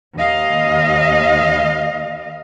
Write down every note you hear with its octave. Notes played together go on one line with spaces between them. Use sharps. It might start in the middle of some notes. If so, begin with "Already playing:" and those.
D#2 D#5 F5